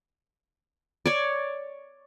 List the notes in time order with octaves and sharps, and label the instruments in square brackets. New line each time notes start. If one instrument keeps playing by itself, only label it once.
[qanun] C#5 D5